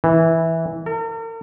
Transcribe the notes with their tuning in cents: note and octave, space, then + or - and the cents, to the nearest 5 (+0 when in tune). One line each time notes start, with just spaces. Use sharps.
E3 -10
A#4 -45